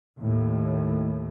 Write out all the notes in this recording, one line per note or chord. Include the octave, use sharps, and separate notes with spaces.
D#2 A2